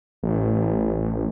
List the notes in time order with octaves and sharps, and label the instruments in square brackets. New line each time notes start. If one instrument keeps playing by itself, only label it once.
[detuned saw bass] A1